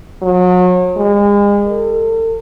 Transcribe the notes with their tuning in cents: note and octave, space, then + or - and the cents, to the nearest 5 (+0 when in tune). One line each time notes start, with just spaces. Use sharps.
F#3 -35
G#3 -35
A4 +45